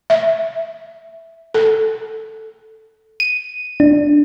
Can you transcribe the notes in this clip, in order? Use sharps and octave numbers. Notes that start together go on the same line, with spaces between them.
E5
A4
D#7
D4